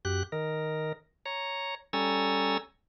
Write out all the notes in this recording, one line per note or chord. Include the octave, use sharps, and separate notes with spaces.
F#2 G4 F#6
D#3 A#4
C#5 A#5
G3 C#4 A4 G#5 A#5 E6